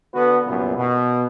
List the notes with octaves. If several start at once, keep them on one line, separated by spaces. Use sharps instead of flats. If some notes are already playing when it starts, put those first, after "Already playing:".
D3 B3 F#4 B4
C2 F#2 A#2 B3
B2